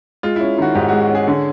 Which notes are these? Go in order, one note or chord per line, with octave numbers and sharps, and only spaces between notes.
G#3 F4
C#4 E4
D#3 F#4
G#2 G4
F#4
G#3
F#4
C#4
G#4
D3